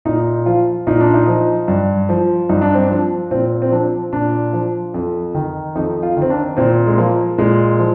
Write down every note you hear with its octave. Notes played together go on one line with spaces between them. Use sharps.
A#2 D#4
F3 F4
A#2 D#4
D4
D#4
F3
G2
F3
G2 D#4
D4
C4
F3 D4
A#2 C4
C4
F3 D4
A#2 D4
F3
F2
D#3
F2 D#4
F4
D#3
C4
D4
A#2 C4
G#3
F3 A#3
A#2 G#3
F3